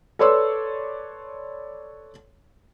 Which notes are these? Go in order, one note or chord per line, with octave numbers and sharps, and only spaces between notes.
A4 B4 C#5 D5 C6 E6